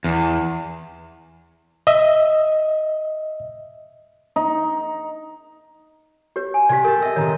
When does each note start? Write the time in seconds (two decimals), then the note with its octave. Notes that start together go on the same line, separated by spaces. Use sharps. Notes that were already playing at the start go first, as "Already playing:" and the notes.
0.04 E2
1.87 D#5 E5
4.36 D#4
6.36 G4 B4 C#5
6.54 G#5
6.69 C3 G4 D5 B6
6.84 G4 A4 A#4
7.02 D#5 E5 E6
7.16 C3 D#3 C#5 A#5